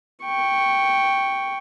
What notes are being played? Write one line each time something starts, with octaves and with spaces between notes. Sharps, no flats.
G5 C#6